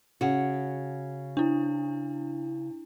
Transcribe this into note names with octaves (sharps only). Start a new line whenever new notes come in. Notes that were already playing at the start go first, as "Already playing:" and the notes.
C#3 F#4
D4 E4